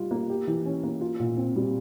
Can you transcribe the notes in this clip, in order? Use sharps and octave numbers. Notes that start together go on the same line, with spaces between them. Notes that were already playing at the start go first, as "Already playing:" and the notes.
Already playing: G3 F4
A#3
G4
E3
C#4
A#3
F4
A#2
C4
G3